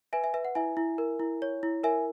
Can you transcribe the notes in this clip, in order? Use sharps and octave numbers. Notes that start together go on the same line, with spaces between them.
B4 E5 G#5
E5 G#5
B4 E5
F#5
E4 E5 G#5
E4
A#4
E4
C#5
E4
A#4 E5 G#5